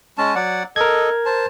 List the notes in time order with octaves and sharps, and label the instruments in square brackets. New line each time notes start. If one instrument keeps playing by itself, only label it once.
[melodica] G#3 C#4 A5
F#3 D5 F#5
[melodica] A4 D#5 [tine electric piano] A#4 G#6
[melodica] C5 A5